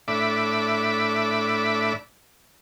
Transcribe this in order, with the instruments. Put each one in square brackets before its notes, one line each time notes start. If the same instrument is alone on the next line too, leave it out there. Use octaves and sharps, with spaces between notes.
[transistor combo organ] A2 D4 E5 B5 D6